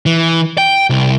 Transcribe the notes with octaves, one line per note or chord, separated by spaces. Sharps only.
E3
G5
C2